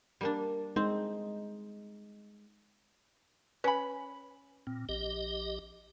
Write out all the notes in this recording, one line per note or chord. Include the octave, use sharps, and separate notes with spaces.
G3 A#3 D4
G#3 C4 D#4
C#4 B4 G#5 B5
A#2 C4
A#1 G4 D#5